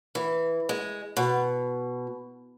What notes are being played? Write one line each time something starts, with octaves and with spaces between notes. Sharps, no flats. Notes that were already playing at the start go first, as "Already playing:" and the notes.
E3
G#3
B2